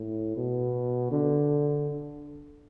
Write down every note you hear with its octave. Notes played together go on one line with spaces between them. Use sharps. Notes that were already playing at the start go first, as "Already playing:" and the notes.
Already playing: A2
B2
D3